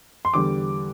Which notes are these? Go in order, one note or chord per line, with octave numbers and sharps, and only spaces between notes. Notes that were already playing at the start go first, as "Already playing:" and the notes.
C6
E2 D3 G3 D6